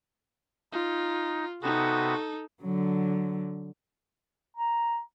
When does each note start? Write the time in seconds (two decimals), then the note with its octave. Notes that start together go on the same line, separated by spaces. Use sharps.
0.72 D#4 F4
1.62 C3 B3 D#4 F#4 A4
2.62 D3 F#3
4.57 A#5